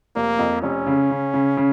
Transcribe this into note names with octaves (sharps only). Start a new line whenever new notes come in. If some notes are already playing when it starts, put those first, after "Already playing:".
F1 A#3
F2
F1 C#4
C#3
C#3
C#3
C#3